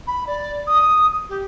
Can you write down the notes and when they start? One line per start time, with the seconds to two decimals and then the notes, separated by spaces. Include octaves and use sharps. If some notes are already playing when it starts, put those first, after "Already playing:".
0.07 B5
0.27 D5
0.67 D#6
1.29 G4